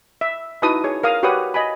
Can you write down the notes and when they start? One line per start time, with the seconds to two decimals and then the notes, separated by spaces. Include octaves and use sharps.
0.21 E5
0.62 D#4 E4 F#4 B4 A5 D#6
0.84 G#4 C#5
1.03 A#4 F5 D#6
1.23 F#4 G4 B4 C#5 F#5 D#6
1.54 D#5 G#5 B5